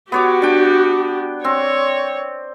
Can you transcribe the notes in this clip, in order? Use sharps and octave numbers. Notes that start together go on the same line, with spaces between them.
B3 F#4 G4 C#5 D6
D4 G5
C4 C#5